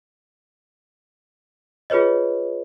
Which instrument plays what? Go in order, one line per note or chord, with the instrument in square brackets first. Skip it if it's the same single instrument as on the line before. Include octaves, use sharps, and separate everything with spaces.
[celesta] F4 G#4 B4 C#5 D#5